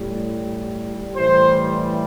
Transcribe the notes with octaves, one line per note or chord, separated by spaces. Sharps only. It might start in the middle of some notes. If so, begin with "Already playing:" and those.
Already playing: A2 G3
A2 E3 G3 C5